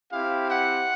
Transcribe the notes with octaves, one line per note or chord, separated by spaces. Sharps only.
C4 E4 G4 F5
F#5